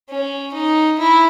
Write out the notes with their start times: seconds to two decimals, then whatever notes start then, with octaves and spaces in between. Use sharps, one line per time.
0.09 C#4
0.54 D#4
0.99 E4